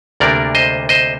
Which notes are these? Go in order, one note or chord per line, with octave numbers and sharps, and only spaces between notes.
D2 C3 G3 A#3 D4 A#4 D5
C5 D#5
C5 D#5